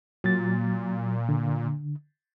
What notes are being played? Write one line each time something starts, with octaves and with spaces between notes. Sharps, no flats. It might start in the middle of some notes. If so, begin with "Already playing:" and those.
A#2 F#3 A6
D3